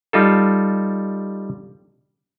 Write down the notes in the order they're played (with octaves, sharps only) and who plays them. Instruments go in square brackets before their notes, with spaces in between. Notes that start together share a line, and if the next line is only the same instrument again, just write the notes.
[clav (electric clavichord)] G3 D#4 F4 A4